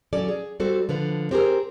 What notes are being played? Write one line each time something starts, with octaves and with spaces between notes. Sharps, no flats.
F#3 C#4 A4 D5
G#4
G3 C4 F#4 A4
D3 F3 B4
C4 G4 G#4 A#4